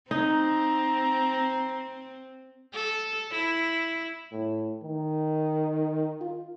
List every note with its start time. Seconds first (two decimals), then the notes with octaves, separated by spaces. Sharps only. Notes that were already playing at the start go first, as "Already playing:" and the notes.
0.11 C4 D#4 A#5
2.74 A4
3.32 E4
4.32 A2
4.82 D#3
6.21 F4